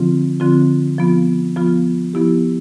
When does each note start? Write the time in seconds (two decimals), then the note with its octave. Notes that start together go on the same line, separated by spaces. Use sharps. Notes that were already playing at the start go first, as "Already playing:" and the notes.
Already playing: D3 F3 C4 F4
0.40 D3 F3 C4 F4
0.98 F3 B3 F4
1.56 F3 B3 F4
2.13 F3 B3 E4 G4